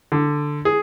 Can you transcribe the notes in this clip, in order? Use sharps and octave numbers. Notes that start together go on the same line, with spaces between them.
D3
G#4